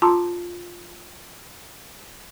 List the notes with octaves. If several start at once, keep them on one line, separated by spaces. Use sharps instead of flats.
F4 A5 A#5 C6 D6 E6